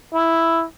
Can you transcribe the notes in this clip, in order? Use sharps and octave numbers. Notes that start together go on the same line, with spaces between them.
E4